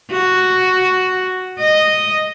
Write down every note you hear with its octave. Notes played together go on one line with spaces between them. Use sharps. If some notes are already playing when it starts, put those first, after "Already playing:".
F#4
D#5